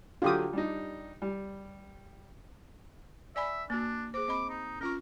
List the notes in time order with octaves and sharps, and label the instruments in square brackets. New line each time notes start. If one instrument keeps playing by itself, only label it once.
[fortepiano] D3 F#3 [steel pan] F4 G4 D#6
[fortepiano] G3 D4 D#4
G3
[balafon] D5 G#5 B5 [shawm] E5
[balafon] A#3 F#4 [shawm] D4
[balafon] G#4 C5 [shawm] D6
[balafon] C4 D#5 B5
[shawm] D#4
[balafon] C#4 F4 C#6 [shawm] A#4